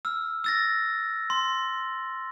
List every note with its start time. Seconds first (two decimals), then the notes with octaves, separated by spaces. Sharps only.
0.05 E6 F6
0.44 E6 A6 A#6
1.30 C6